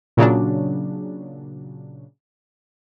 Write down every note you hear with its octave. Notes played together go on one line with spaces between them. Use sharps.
A#2 C#3 F#3 D4